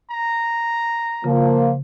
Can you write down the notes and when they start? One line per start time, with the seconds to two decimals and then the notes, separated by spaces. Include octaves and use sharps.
0.11 A#5
1.24 C#3 F3 A#3